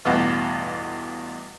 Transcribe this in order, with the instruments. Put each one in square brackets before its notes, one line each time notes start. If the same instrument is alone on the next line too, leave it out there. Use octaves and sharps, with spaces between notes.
[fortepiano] A1 E2 G2 B2 F4